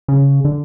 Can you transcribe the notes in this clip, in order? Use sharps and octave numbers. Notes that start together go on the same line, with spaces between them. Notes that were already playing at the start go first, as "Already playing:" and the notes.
C#3
D3